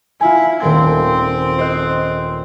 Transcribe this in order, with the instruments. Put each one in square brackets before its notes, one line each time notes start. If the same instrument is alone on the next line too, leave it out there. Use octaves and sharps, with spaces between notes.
[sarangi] E4 [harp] F4 G#5
[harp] D#1 A3 G#6 [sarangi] C4
[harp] C5 D#5 F#6